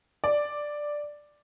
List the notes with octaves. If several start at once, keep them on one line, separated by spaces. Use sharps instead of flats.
D5